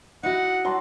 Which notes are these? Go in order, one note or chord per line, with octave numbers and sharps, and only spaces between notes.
D#4 E4 F#4 F#5
F#3 A5 C6